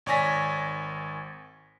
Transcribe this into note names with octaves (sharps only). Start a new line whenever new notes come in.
G#1 C#5 D5 G#5 A#6 B6